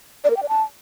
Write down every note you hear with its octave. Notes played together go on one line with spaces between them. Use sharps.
D5
A#4
G5
D5
A5